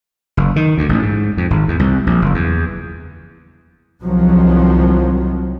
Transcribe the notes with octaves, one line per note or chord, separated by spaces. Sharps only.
F#1
D#3
D2
A1
G#2
F2
G#1
E2
C2
A#1
F#1
E2
C2 D#3 F3 F#3